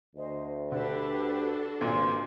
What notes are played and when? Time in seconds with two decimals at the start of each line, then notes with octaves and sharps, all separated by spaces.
0.16 D2 C5 D#5
0.72 D3 D4 F#4 G4 A4 B4
1.81 G#1 G2 A#2 C#3 C5 C6 D6